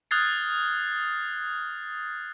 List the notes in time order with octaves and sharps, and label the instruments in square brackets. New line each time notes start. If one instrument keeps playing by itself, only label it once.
[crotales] D#6 F6 F#6 G#6 A6 C7